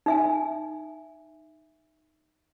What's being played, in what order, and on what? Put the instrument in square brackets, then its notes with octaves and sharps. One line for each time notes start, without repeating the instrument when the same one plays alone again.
[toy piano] D#4 E5 G#5